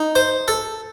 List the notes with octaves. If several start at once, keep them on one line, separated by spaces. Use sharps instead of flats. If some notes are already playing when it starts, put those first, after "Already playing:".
Already playing: D#4
C5
A4